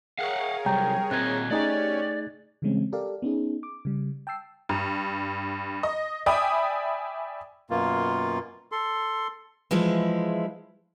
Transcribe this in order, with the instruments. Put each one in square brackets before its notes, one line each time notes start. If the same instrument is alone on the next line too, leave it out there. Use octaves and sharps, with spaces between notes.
[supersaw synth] G#4 A#4 C#5 [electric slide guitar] F5 F#5
[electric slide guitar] C3 F#3 [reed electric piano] G3 [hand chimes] G5 A#5 G6
[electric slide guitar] A#2 D#5 A#5 [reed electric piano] C4 [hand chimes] F#6 G#6
[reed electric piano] A3 D#4 G#4 [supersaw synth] C#4 G4 C#5 [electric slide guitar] D5
[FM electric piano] C#3 E3 G3 G#3 C4 C#4
G4 A4 A#4 D5 F5
B3 C#4 D#4 G#4
D6
C#3 G3
G5 A5 E6 C7
[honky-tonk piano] G2
D#5
D5 E5 G5 G#5 B5 D#6
[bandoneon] F#2 B2 A#3 F4
A4 C6
[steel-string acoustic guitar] E3 F3 G#3 E4